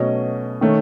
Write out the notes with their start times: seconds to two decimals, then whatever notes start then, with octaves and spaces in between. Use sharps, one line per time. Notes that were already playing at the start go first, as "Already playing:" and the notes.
Already playing: B2 F#3 A3 C#4 D#5
0.61 D#3 A3 C#4